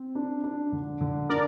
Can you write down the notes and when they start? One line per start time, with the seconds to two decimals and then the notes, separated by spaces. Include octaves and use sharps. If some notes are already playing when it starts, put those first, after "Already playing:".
Already playing: C4
0.15 D4
0.44 D4
0.72 D3
1.01 D3
1.29 D4 A#4 D5